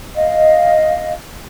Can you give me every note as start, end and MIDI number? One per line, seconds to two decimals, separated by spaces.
0.15 1.13 75
0.15 1.13 77